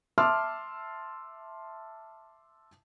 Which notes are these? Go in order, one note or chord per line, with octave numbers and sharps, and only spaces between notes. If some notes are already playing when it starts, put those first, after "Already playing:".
E5 A5 C6 D6 E6 F6